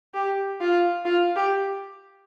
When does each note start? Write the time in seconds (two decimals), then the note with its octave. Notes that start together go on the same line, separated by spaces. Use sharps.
0.14 G4
0.60 F4
1.05 F4
1.36 G4